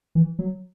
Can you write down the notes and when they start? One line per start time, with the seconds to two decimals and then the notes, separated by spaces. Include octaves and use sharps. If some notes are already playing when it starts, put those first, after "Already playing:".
0.15 E3
0.39 F#3